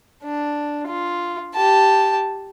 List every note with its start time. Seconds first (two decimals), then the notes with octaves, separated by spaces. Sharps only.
0.23 D4
0.87 F4
1.55 G4 A5